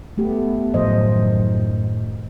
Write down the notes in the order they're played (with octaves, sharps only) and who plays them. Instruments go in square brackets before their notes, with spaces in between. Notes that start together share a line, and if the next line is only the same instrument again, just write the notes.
[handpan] A3 G4 [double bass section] B3
[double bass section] F#2 D#3 [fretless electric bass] A2 [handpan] F3 C5 D#5